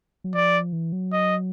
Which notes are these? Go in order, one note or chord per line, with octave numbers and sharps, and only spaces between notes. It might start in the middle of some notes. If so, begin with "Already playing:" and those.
F#3
F3 D5
E3
F#3
D#5